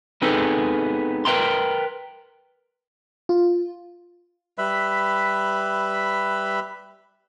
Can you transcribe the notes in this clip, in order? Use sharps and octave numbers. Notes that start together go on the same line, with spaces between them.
B3 C4 D#4 G#4 A4 B4
A#4 B4 D#5 G5 A#5 C6
F4
G3 B4 E5 B5